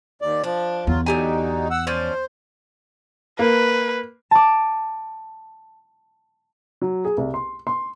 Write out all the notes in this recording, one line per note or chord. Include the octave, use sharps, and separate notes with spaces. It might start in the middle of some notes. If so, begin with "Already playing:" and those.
D#2 D5
F3 D4
E2 F#3 F4
D3 F#3 D#4 G4 G#5
F#5 E6
F3 C#4 C5 D5
A#3 B4
A5 D6
F#3
G#4
C2
C6
C6